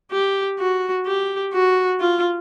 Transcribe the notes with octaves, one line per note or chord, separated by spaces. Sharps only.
G4
F#4
G4
F#4
F4